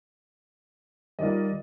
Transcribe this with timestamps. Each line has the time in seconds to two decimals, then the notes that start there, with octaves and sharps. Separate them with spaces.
1.19 D#3 G3 F4 D5 D#5